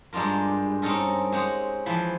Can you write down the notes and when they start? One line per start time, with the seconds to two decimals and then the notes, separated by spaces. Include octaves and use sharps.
0.13 G2 G#3 D4 F4 A#4
0.82 C4 C#4 D#4 A4 A#4
1.32 G#3 C4 G4 G#4 C#5 F#5
1.86 E3 F3 B5